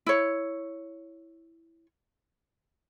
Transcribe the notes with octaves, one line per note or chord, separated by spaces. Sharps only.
E4 C#5